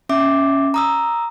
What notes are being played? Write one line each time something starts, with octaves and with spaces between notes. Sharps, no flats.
C#4 E5 D6
A#5 D#6 E6